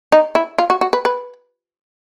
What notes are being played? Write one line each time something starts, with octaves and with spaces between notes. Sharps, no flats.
D#4
E4
F4
F#4
F#4
B4
B4